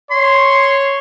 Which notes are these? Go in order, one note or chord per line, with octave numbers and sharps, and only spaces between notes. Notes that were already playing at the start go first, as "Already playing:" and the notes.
C#5 C6